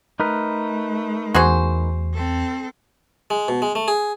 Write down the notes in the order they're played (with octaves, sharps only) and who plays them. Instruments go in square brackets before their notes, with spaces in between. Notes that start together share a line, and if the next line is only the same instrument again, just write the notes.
[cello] A3 [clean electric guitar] D#4 A#4 B4
[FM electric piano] E2 [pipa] F#4 G#4 C5
[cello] C4 A4
[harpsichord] G#3
B2
G#3
A3
G#4